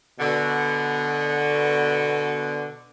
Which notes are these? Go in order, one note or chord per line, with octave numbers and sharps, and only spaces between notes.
B2 D3